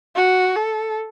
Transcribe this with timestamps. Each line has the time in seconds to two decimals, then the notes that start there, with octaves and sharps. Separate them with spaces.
0.16 F#4
0.56 A4